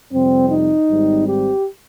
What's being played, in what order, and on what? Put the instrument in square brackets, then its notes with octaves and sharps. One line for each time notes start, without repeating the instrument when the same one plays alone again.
[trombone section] F2 C3 G3 C4
D#4
G#1 G#2 G3 C4
G4